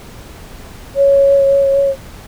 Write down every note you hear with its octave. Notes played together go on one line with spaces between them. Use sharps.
C#5